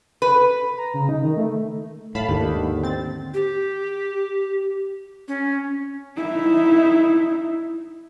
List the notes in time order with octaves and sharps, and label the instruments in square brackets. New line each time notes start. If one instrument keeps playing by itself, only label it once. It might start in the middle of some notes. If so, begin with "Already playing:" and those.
[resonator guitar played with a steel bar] B4
[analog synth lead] A#5
C#3
D#4
D#3
A3
[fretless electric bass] A2 [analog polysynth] F5 A5 B5
[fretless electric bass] D#2 [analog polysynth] G#2 D3
[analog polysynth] C4 A6
[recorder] G4
C#4
[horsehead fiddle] D#4 E4